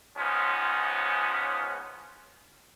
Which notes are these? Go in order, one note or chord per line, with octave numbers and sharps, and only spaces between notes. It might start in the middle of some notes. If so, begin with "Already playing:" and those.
C#2 F3 B3 C#4 D#4